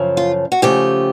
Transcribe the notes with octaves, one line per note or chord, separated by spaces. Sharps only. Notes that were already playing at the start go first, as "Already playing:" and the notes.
Already playing: F#2 C#3 F3
F4
F#4
C#3 F3 A3 G4